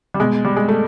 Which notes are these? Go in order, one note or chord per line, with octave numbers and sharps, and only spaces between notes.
G3
B2 G#3
G3
G#3
A3